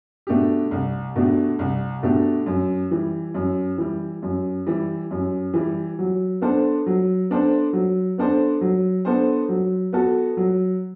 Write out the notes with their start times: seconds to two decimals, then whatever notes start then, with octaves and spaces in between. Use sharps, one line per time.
0.27 B2 A3 D4 G4
0.71 C2
1.15 B2 A3 D4 G4
1.59 C2
2.03 B2 A3 D4 G4
2.46 F#2
2.91 E3 G3
3.34 F#2
3.78 E3 G3
4.23 F#2
4.66 E3 G3
5.11 F#2
5.54 E3 G3
5.99 F#3
6.41 B3 D4 A4 C5
6.86 F#3
7.30 B3 D4 A4 C5
7.73 F#3
8.18 B3 D4 A4 C5
8.61 F#3
9.05 B3 D4 A4 C5
9.49 F#3
9.93 B3 F#4 A4
10.37 F#3